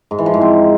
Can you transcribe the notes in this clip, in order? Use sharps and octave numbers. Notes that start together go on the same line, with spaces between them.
G#2
E3
F3
G#2
C4